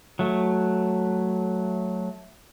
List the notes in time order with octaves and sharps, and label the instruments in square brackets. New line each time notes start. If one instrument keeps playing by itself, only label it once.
[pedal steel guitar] F#3 A3